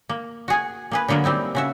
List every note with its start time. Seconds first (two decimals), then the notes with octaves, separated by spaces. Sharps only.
0.09 A#3
0.48 F#4 G#4 G#5
0.91 A#3 G#4 B4
1.08 D3 F#3 A#3 B3 A#4
1.24 G3 C4 D#4 E4
1.55 C#3 F#4 E5